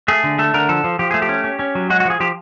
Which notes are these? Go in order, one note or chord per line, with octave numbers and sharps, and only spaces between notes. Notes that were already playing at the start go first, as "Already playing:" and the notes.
A3 G#4
D3
A3 A4
D3 A#4
F3 A4
F3
F3 G4
A3 G#4
G4
C#4
C#4
C#4
F#3
G#3 F#4
F#4
F3 G#4
F3 G4